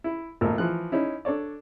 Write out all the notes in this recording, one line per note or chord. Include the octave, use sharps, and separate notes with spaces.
E4
G#1 A#2 A3 A#4 E6
E3 F3 F#6
C#4 D#4 E4
D4 A4 C#5 D5